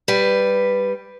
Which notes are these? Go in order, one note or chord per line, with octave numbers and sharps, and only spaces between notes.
G3 B4